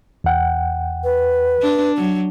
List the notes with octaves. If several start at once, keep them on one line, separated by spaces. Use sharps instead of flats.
E2 F#5 G5
B4
D4
F#3